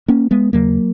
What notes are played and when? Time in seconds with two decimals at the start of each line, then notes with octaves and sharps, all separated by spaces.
0.08 A#3 C#4
0.31 G#3 B3
0.53 D#2 C#3 F#3 A#3